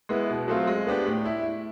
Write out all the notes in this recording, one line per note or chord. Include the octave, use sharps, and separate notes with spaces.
G#3 B3 E4
B2
F#3 A3 C4 F4
G#3
B3 D4 G4
A2
E4